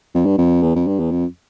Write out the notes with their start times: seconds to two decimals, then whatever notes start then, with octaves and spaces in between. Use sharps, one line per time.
0.15 F2
0.26 G2
0.38 F2
0.63 E2
0.76 F2
0.87 G2
1.00 E2
1.11 F2